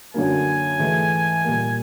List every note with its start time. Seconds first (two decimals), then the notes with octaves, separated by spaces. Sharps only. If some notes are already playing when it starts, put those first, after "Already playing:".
0.14 F#2 D3 F#3 A#3 G#5
0.79 G#2 E3 A3
1.45 A#2 G3 A#3